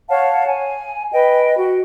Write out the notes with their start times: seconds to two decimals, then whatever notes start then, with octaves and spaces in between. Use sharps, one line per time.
0.09 C#5 F5 F#5 A5
0.47 G#5
1.13 B4 D#5 G5
1.56 F#4